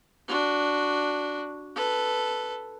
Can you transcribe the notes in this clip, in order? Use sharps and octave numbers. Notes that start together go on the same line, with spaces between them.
D4 F#4
A4 B4